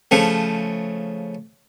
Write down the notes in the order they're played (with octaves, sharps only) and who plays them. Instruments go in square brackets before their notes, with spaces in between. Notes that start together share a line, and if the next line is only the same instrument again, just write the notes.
[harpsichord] C#3 F3 A3